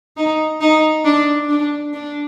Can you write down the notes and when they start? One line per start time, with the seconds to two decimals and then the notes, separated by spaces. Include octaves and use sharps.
0.17 D#4
0.61 D#4
1.05 D4
1.49 D4
1.93 D4